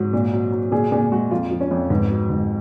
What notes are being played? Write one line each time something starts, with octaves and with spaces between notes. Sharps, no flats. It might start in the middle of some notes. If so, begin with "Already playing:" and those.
Already playing: G#2 F#3
A#2
F#3
F#3
A#2 G#4
A#2 G#4
G#3 F#4
F2 F4
F3
C#4
F2
G#2 B3
F#3
G#2